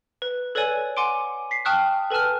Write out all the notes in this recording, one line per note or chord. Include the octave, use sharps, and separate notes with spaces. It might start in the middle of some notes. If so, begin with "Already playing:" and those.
B4
A4 B4 C#5 D5 G#5
F#5 G#5 C6 D6 D7
B6 C7
G5 A5 C#6 D#6 F6 F#6
A4 B4 G#5 A5 F6